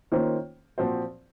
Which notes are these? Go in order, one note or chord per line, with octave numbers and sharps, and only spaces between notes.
D#3 A#3 C#4 F4 C5
A#2 F3 C4 F#4 C5